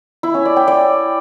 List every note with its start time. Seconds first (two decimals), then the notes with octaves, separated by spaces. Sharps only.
0.23 E4
0.34 C#4
0.45 D5
0.56 G5
0.68 D5